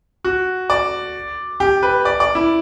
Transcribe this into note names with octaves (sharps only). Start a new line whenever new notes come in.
F#4
D5
G4
B4
D5
D5
E4